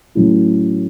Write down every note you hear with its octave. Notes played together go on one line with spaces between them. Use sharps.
A2 F#3 C#4 E4